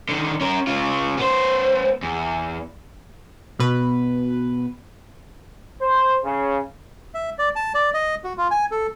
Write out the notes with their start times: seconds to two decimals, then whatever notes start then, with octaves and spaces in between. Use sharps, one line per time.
0.09 D3 D#3
0.41 C#4 A#4
0.67 C#3 F4
1.18 B3 C5
2.03 E2
3.59 B2 B4
5.80 C5
6.24 C#3
7.14 E5
7.38 D5
7.56 A5
7.74 D5
7.94 D#5
8.24 F#4
8.37 F4
8.51 G#5
8.71 A4